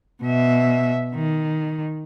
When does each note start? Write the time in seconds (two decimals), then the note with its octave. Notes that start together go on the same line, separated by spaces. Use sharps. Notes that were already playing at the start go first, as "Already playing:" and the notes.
0.23 B2 E5
1.15 D#3